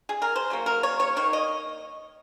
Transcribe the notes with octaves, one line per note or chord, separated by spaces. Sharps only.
G#4
A#4
C5
C#3 F#3 A#3
A#4
C#5
C#5
D#3 A#3 C#5
D#5